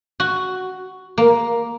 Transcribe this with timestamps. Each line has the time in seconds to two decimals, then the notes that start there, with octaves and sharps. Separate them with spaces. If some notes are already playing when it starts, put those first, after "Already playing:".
0.20 F#4
1.18 A#3